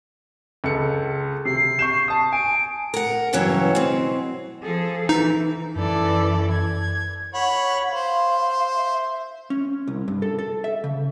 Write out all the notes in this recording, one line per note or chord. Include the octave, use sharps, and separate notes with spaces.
C#2 A4 C#7
C3 C7
C#6 G6 E7
A5 D#6
G#5 D7
A#4 F#5
G2 C#3 E3 F#3 C#4
B2 C4
F3 G#4 A4
E3 D#4
F#2 E3 A4 D5
G#6
C#5 F#5 B5
C5 F5
E5
C#4
C2
G2
A4
A4
E5
C#3